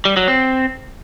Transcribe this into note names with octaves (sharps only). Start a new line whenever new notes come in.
G3
F#3
C4